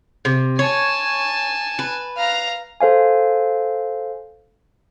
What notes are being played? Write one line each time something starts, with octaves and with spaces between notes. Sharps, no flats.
C3
C#5 G#5 A5
B4
F5 A#5
A4 C5 F5 G#5